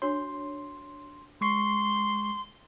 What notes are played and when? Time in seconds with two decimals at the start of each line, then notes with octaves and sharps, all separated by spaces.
0.02 D4 F#4 C#5 C6
1.41 G#3 C6 C#6 C7